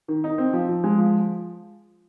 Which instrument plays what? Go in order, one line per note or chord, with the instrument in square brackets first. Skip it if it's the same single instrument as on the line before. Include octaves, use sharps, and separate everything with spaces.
[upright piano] D#3
D#4
C4
F3
F3
G#3
F3